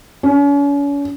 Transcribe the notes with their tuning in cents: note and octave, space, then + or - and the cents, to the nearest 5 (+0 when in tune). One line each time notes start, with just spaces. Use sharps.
C#4 +40